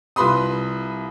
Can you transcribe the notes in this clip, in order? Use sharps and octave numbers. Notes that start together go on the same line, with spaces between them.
C2 F4 B4 B5 C6 D#6